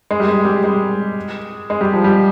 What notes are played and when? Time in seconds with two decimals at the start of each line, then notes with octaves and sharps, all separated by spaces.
0.11 G#3
0.20 G3
0.28 G#3
0.45 G3
0.64 G#3
1.70 G#3
1.81 G3
1.93 F3
2.04 G3